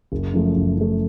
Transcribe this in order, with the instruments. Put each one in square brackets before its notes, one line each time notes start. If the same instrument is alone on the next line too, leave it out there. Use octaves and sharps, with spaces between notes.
[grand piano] F#1
F#2 F3 A3
F#1
F#2 F3 A3